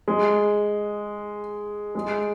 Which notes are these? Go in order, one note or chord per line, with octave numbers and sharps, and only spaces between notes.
G#3
G#3